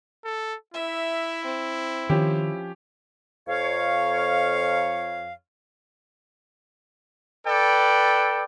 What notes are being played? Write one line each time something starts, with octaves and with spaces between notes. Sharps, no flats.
A4
E4 E5
C4
D#3 F3 C#4 G4
F2 C#5 F5
A4 B4 D5 G5